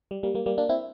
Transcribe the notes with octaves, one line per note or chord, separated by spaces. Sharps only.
G3
G3 A#3
G3 A#3
G3 A#3
A#3 D4
C4 E4